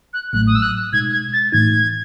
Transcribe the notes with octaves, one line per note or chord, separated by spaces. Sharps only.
F#6
A1 A2 F#3 A3 F#6
D#6
E6
F#6
B2 G#3 D#4 G#6
G#6
A6
A2 E3 A3 D#4 G#6